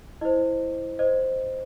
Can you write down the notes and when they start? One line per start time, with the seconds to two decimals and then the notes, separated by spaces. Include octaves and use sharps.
0.21 E4 C5 D#5
0.99 C5 D#5